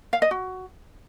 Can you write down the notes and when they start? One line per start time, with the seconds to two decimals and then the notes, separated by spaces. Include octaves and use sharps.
0.13 F5
0.22 D#5
0.31 F#4